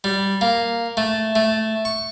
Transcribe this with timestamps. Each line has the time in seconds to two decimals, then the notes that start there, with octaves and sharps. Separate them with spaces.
0.04 G3
0.41 A#3
0.97 A3
1.35 A3
1.85 C#6